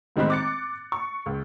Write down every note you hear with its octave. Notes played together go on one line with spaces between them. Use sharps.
A2 D#3 G#3 C4 B5 F#6
D6 A6 C#7
C#6
C#2